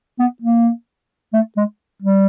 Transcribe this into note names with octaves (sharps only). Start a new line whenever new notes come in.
B3
A#3
A3
G#3
G3